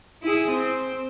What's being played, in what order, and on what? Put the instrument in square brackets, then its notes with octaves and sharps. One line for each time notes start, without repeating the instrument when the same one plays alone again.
[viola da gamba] E4 G#4
C4